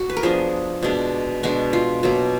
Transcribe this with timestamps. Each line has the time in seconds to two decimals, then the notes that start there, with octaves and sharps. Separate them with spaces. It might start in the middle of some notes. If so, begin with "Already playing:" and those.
Already playing: F#4
0.10 B4
0.17 A#4
0.23 F3 B3 D4 G#4
0.83 B2 G#3 D4
1.43 B2 G#3 D4 F#4
1.73 F4
2.03 B2 F#3 A#3